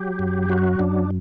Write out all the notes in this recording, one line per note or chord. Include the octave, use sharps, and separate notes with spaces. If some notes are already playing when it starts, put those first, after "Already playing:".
Already playing: F#3 G4
F#2
F#3 F#4
F#2 D4